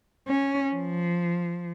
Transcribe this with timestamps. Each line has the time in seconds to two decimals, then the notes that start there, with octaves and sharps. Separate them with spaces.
0.28 C#4
0.73 F3